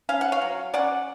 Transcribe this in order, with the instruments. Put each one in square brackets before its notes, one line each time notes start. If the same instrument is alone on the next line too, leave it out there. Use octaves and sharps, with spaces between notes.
[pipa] C#4 F5
F#5
C#5 F5
F#3
C#4 D5 F#5